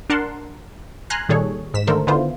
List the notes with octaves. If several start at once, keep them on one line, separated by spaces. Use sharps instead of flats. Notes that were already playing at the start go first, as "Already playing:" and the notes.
D4 A#4 F#5 A5 C6
G#5 A#5 C6 F6 F#6
A#2 D#3 G3 G#4 A4 C#5
G#2 B6 E7
D3 D#3 A3 A4 A#4 C5
D3 D#3 B3 E4 F4 C5